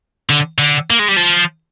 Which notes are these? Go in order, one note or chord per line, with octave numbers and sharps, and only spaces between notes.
D3
D3
A#3
G#3
G3
F3